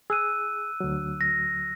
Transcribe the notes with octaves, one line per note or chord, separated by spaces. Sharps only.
G#4 E6 F#6 D#7
D2 F#3
A#6